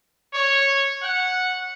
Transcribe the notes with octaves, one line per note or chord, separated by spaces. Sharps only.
C#5
F#5